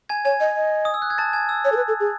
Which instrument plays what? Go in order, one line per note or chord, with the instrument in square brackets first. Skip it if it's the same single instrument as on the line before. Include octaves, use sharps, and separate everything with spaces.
[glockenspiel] G#5 G#6
[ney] C#5 [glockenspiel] G#5 G#6
[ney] D#5
D#5
[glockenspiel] D#6
E6
F#6
G#6
A5 A6
G#5 G#6
E6
[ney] C#5
A4
B4
A4
G#4